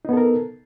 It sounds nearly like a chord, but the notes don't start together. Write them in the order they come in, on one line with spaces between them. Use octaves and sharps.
D#4 B3 A4 A#4